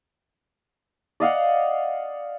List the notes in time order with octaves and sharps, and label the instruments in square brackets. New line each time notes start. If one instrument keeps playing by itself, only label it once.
[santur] D5 D#5 F5 F#5